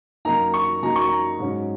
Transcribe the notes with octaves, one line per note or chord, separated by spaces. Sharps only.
F#2 F#3 A#3 D#4 A#5
C#6
F#2 F#3 A#3 D#4 A#5
C#6
A#5
G#2 F#3 C#4